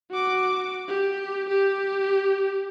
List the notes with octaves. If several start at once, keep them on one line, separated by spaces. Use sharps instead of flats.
F#4 D6
G4
G4